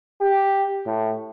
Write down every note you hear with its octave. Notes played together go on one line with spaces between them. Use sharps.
G4
A2